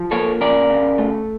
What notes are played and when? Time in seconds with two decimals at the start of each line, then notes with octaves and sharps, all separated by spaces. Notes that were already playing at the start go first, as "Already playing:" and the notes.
Already playing: F3
0.11 A#3 A4 C#5
0.41 C#3 A#4 D5
0.70 C#3
0.98 A3